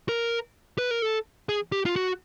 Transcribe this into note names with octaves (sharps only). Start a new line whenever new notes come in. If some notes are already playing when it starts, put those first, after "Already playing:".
A#4
B4
A#4
A4
G#4
G4
F4
F#4